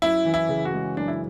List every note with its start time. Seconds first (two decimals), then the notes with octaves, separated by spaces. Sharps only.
0.02 F#2 E4
0.25 E3
0.34 E4
0.49 C#3
0.65 F#4
0.74 G#3
0.97 F#2 D4
1.08 E4